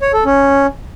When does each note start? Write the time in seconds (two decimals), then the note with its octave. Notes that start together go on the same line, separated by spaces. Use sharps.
0.01 C#5
0.13 A4
0.25 C#4